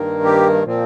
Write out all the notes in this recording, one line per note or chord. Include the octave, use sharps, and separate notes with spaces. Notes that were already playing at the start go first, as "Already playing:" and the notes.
Already playing: G2 D#3 A#3
G4
A#2 F3 C4